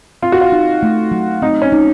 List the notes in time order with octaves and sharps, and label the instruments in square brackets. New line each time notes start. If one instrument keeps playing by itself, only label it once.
[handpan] C4 [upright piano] F4
[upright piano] F#4
F4
[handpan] D#4
A3
F#3
[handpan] C4 [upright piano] D#4
[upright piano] C#4
[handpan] D#4